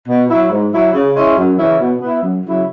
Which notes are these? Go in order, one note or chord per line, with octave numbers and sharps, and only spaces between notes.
B2
F#3 E4
G#2
F#3 E4
C#3
G#3 C#4 E4
F#2
C#3 E3 C#4 E4
B2
B3 E4
F#2
C#3 F#3 E4